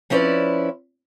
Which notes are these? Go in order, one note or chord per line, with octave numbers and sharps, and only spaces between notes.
F3 C4 C#4 E4 B4 D5